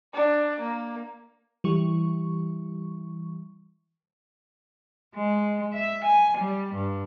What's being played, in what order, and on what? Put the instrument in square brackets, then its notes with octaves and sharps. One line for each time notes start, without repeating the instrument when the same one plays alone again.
[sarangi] D4
A#3
[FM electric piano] E3 G3 C#6
[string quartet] G#3
E5
G#5
G3
G2